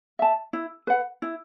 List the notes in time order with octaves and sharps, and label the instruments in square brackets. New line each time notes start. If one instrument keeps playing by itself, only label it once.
[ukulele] E5 A5
E4
B4 F#5
E4